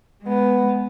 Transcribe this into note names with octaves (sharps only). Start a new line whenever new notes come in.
G#3 B3